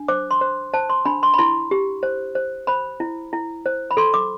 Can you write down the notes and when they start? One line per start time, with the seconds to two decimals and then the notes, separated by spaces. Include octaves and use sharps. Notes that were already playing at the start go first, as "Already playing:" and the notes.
Already playing: D4
0.08 C5 D6
0.31 C6
0.41 C5
0.74 C5 A5
0.90 C6
1.05 D4 B5
1.23 C6
1.34 B5
1.38 E4 C6
1.71 G4
2.03 C5
2.35 C5
2.67 C5 B5
3.00 E4
3.33 E4
3.66 C5
3.91 B5
3.97 A4 C6
4.14 D6